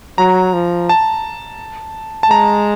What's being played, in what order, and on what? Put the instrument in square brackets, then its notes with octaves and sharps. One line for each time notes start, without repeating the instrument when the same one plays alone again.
[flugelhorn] F#3 [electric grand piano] A#5
[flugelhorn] F3
[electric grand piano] A5
A5
[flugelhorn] G#3 [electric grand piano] A#5